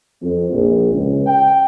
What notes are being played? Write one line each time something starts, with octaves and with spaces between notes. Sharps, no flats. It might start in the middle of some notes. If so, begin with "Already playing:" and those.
F2
A#1
C#2
G5